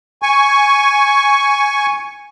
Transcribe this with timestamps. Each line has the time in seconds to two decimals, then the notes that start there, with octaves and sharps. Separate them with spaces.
0.23 G#5 C#6